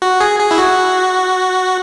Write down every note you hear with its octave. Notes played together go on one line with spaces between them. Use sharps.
F#4
G#4
G#4
E4
F#4